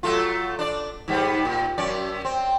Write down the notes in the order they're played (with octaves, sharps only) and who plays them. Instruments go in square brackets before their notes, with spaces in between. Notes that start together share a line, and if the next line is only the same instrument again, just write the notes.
[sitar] F#3 A3 F4
D4 D5
G#2 G3 B3
A#2
F#2 C#4 D5
C4